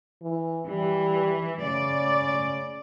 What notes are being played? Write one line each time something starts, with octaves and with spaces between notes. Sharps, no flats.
E3
E3 G3
C#3 D5